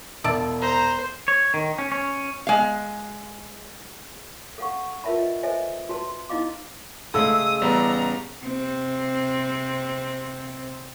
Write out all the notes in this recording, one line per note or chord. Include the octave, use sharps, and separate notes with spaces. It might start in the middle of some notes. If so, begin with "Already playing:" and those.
E1 D5 E5 A5
C5 A#5
C#5
D#3
C#4
C#4
G#3 F5
A4 F5 F#5 C#6
F4 A#4 B4 E5 A5 B5
D#5
A4 B4 C5 D#5 E5 G#5
F#4 B4 A5 C6
D#4 E4 D#5 F5 D6
C#3 G#3 A3 D#6 E6
A1 G3 B3 A#5
C3 C4